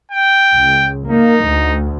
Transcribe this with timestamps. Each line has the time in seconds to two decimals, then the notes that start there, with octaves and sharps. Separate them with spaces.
0.12 G5
0.55 C#2
1.09 A#3 D#4
1.45 D2